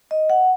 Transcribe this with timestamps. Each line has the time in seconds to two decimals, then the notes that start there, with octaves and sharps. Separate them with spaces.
0.11 D#5
0.30 F#5